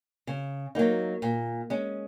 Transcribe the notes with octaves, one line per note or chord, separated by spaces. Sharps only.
C#3
F#3 A#3 D#4
A#2
G#3 C#4